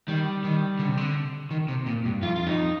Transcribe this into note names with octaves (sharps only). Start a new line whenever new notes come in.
D#3 G3
D#3
D3
C3
D3
D#3
C3
A#2
G2
F2 F4
F4
F2 D#4